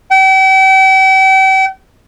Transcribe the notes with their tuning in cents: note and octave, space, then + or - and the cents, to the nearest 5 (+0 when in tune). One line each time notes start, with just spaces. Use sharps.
G5 -40